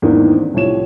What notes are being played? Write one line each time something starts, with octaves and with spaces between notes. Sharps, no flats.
E2 G#2 D#3 A#3 B3 D4
C4
C2 A2 F3 C#5 E7